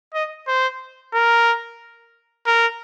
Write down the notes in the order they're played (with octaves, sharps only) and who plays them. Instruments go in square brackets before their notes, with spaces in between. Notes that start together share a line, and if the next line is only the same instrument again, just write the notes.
[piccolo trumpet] D#5
C5
A#4
A#4